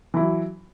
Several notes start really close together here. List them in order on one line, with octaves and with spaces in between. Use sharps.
E3 E4 F#3